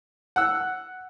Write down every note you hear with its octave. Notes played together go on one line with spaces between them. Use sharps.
F#5 E6